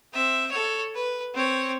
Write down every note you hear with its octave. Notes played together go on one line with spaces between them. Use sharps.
C4 E5
A4 C#5
B4
C4 C#5